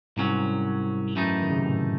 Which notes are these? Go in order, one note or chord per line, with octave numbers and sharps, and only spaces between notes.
C2 G#2 C3 F#3 C#4
F#2 E3 A3 D#4
D#3
C#3
C3
A2